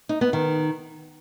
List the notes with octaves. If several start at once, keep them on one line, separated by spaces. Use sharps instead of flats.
D#4
B3
D#3